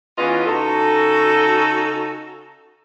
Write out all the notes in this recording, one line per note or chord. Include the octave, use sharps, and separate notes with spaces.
E2 E3 C#4 F4 B4 D#5
C#3 D#4 F#4 A4